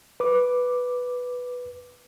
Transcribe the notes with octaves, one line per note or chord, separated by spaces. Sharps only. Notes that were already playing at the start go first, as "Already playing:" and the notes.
B4 D6